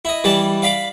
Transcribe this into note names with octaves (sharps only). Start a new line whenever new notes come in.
E4 D#5
E3 G3 D5 A5
D5 F5 B5 D6